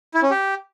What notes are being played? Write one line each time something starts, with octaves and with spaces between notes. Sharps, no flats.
E4
C#4
G4